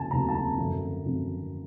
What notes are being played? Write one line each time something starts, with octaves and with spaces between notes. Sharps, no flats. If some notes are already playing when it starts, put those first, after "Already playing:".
Already playing: F1 D#2 C#3 F#3 G#5 A5
F1 D#2 C#3 F#3 A#5
A5
A#5
G#1 F#2 D3 F3
G#1 F#2 D3 F3